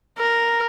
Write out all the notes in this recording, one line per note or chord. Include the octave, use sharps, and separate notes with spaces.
A#4